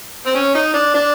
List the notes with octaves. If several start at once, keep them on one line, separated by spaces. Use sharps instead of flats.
C4
C#4
D#4
D4
D4